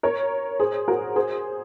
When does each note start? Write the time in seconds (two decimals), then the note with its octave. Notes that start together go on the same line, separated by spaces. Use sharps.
0.03 A#4 C#5
0.60 G#4 C5
0.88 F#4 A#4
1.16 G#4 C5